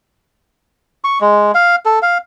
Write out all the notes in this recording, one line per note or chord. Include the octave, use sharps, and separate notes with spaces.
C#6
G#3
F5
A4
F5